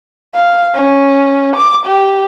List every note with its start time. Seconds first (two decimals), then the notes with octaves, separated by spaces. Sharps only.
0.34 F5
0.74 C#4
1.56 D6
1.86 G4